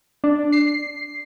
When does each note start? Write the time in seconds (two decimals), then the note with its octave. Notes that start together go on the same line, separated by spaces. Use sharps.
0.24 D4
0.52 C7